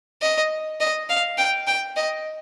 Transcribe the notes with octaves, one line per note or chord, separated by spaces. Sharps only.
D#5
D#5
F5
G5
G5
D#5